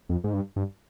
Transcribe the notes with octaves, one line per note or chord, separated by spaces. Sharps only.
F2
G#2
G2
G2